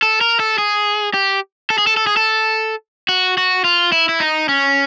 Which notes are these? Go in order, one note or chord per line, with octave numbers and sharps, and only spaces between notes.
A4
A#4
A4
G#4
G4
A4
G#4
A4
A4
G#4
A4
F#4
F#4
F4
E4
E4
D#4
C#4